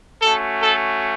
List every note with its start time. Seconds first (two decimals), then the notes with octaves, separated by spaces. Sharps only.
0.22 A3 C#4 F#4 A4
0.62 A4